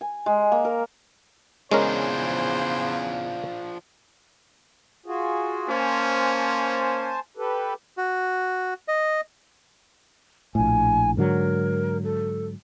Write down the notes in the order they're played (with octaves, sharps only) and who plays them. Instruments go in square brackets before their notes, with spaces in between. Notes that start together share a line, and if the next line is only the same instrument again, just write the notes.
[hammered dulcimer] G#5
G#3
A#3
A#4
[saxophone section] E2 C#3 [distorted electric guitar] F3 D4 [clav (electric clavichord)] G#3 C#4 A#4 [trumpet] C5
[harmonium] F4 F#4 G#4
[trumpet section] A#3 C#4 [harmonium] C5 G#5 A5
[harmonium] G4 A4 B4
[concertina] F#4
D#5
[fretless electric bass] A#1 A2 [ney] G#5
[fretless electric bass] G#2 D3 F#3 [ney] A#4
[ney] A4